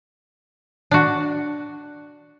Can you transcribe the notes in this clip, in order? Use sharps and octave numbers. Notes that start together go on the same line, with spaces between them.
D4 F#4